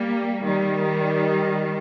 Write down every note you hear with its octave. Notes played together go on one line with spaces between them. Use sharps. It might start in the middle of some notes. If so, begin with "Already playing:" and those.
Already playing: G3 A#3
D#3 G3